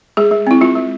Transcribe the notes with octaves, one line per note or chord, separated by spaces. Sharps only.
G#3 G#4
G#3
C4 E4
G#3 F4
G#3